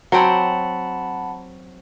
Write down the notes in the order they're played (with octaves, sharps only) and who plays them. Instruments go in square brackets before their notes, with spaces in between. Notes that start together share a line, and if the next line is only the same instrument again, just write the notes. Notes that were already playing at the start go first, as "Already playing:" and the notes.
[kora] F#3 C4 G5 [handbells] F#5 A5 B5